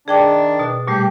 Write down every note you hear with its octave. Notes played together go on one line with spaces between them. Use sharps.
D#3 D4 G#4 G5 D6
B2
A#2 G3 A3 G4